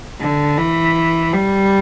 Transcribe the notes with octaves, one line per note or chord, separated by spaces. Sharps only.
D3
E3
G3